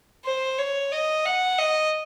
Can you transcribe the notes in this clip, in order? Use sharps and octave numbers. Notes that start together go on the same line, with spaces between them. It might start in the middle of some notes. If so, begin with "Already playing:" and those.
C5
C#5
D#5
F#5
D#5